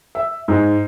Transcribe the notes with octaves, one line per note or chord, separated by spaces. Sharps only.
E5
G#2